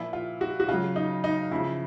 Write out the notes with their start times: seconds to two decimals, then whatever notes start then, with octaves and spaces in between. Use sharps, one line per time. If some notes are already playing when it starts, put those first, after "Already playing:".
Already playing: A#2 F3 E4
0.13 F4
0.41 F#4
0.60 F#4
0.69 C#3 F#3 F4
0.96 D#4
1.24 D#4
1.51 C#3 F3 E4